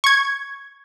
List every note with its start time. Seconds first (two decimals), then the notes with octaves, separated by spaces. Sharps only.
0.04 C#6 G#6